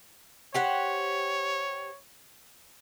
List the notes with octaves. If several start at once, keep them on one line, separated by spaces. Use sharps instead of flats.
G4 C5 C#5 F#5